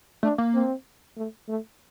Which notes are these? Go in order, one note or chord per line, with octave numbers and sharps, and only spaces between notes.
A3 D4
A#3
C4
A3
A3